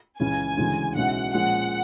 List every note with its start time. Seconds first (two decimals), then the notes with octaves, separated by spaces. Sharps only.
0.19 C#2 C#3 E3 G#3 C#4 G#5
0.57 D2 C#3 E3 G#3 C#4
0.95 B1 B2 G#3 C#4 E4 F#5
1.33 A#2 F3 G#3 C#4 F#5